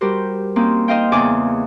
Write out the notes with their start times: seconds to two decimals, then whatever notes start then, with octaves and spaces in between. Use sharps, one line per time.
0.01 G3 F#4 G4 A#4 C5
0.56 A#3 C4 C#4 D#4
0.88 D#4 C5 D#5 F5 G5
1.12 E2 C#3 D#4 D5 G#5 D6